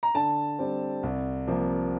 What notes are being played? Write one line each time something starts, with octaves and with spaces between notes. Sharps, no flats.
A#5
D3 A5
G3 C4
C2
C3 F3 A#3